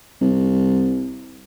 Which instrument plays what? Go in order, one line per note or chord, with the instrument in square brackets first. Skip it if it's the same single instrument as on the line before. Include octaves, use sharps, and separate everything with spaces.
[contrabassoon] C2